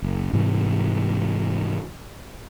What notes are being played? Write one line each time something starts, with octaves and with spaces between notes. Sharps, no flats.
F#1
G#2 C3 E3 G3